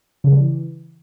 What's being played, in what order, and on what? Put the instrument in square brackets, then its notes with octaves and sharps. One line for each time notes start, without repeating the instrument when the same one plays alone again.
[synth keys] C#3
G3
E3